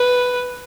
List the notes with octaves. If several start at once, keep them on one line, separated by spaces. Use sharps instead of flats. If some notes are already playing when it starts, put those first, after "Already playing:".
Already playing: B4